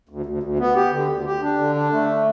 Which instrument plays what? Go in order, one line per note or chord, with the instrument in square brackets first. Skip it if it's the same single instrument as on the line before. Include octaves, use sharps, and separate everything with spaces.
[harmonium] D2
D2
D2
B3
G4
D3
D2
G4
D4
D3
D4
A3